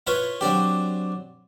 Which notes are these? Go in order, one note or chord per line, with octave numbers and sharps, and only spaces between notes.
E4 F4 B4 C#5
F#3 C4 D4 G4